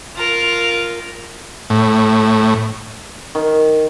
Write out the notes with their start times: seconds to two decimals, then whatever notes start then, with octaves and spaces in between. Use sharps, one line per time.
0.16 F4 A#4
1.70 A2
3.35 D#3